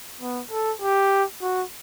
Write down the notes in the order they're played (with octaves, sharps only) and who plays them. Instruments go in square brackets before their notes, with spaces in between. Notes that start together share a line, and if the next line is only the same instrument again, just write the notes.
[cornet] B3
A4
G4
F#4